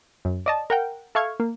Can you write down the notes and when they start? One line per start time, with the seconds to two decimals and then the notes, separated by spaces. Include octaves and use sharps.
0.25 F#2
0.46 D5 D#5 A5
0.70 A#4 F#5 G5
1.15 A4 E5 F5 C#6 F6 G#6
1.40 A#3